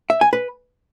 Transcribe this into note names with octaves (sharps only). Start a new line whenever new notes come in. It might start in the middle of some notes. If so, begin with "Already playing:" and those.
E5
G#5
B4